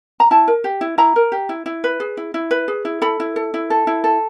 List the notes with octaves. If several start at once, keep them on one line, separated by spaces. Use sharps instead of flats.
A#5
E4 A5
A#4
G4
E4
E4 A#5
A#4
G4
E4
E4
B4
G#4
E4
E4
B4
G#4
E4
A4 B5
E4
A4
E4
A4
E4
A4